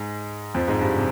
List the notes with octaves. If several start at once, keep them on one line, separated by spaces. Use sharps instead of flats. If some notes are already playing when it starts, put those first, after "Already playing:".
Already playing: G#2 G#3
F2 F3
G#2 G#3
G2 G3
C3